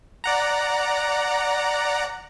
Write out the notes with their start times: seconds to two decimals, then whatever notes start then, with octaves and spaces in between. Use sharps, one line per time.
0.24 D5 F#5 A#5